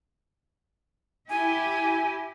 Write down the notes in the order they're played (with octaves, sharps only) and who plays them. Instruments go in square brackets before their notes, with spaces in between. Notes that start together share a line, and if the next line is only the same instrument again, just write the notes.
[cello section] E4 G4 [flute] G#5